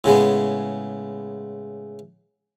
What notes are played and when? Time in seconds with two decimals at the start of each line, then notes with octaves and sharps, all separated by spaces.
0.04 A2 C#3 G#3 B3